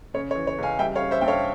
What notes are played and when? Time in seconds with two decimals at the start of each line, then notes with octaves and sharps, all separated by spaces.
0.14 C#3 C#5
0.31 C#5
0.35 E3
0.47 C#5
0.58 C#2 F5 G#5
0.79 G3 E5 G5
0.95 C#5 F5
1.01 C#4
1.11 C5 E5
1.21 G2 G5
1.28 C#5 F5